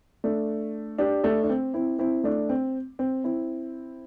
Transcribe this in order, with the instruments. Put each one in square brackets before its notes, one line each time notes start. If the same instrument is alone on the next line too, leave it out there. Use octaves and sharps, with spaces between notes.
[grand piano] A3 D4
D4 G4
A3 D4
D4
C4
C4 E4
C4 E4
A3 D4
C4
C4
C4 E4